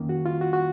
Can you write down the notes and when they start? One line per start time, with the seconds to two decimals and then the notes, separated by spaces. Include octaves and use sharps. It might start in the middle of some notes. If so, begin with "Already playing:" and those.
Already playing: F2 D#3 A#3 C#4
0.09 F#4
0.26 F4
0.41 F#4
0.53 F#4